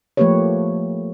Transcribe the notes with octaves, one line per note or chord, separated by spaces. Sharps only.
F3 A3 A#3 G4 B4 C#5